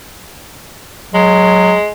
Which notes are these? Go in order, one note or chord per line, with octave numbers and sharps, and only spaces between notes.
F#3 G#3